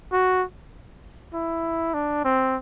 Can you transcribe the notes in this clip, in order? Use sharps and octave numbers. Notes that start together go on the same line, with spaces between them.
F#4
E4
D4
C4